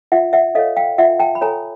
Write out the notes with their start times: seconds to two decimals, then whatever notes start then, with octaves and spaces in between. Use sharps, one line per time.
0.12 F4 E5 F#5
0.33 E5 F#5
0.55 A4 C#5 D#5 F5
0.77 F5 G5
0.98 F4 E5 F#5
1.19 G5 A5
1.35 B5
1.41 A4 C#5 G#5 A#5